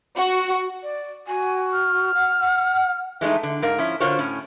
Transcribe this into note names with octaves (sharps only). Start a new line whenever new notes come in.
F#4
D5
F#4 G#5
F6
F#5
F#5
E3 G#3 A3 D#4
D3
G#2 A#4 F5
F3 C#4 E4
D3 F4 F#4 A#4 C5 C#5
A2 C#4